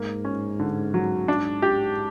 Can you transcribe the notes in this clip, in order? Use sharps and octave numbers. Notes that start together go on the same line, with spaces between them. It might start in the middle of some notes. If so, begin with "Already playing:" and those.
Already playing: G#2 A#3
C#4
D3
F#3
G#2 D4
G4